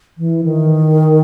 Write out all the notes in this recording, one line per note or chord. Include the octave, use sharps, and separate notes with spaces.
E3
D#3